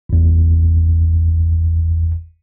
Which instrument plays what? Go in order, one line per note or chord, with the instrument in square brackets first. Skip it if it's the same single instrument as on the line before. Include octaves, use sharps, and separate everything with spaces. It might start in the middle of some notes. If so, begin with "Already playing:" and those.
[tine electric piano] G1 E2